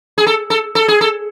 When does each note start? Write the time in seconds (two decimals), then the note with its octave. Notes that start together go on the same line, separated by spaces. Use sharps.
0.18 G#4
0.26 A4
0.50 A4
0.75 A4
0.88 G#4
1.01 A4